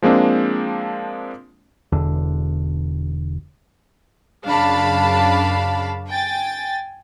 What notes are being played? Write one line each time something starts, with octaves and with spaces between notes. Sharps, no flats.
F3 G#3 A#3 C4 D4
E1 E2 D3
F#2 C#3 D4 F5 A5 B5
G5 G#5 A6